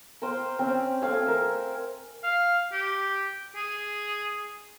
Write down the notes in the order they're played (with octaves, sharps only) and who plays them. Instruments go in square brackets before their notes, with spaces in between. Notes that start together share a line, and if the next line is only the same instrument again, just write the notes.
[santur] C5 F5 G5 A#5
C4 C#4 E5
A3 C4 F5 G#5
A#4 E5
[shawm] F5
G4
G#4